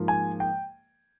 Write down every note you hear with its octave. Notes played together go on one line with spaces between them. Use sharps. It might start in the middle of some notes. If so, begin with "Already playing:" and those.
Already playing: G#2 F3 A#3
G#5
G5